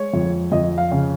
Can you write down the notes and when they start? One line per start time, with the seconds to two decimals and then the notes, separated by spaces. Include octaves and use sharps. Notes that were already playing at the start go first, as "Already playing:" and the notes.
Already playing: G#3 C#5
0.13 F2
0.52 F2 D#5
0.78 F5
0.92 C#3